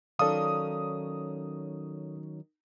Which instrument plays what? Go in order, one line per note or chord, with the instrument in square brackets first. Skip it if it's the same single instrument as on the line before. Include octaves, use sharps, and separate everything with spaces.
[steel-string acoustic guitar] D#3 F#3 C#4 [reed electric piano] A4 D5 F5 [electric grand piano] D#6